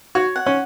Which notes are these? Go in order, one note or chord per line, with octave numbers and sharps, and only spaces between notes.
F#4 C#5
F#5
C#4